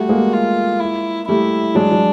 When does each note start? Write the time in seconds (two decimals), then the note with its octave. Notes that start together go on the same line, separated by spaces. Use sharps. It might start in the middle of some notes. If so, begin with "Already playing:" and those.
Already playing: G3 A3 F#4
0.09 G#3 A#3
0.33 F4
0.80 E4
1.28 G3 A3 E4
1.75 F#3 G#3 D4
1.92 F#3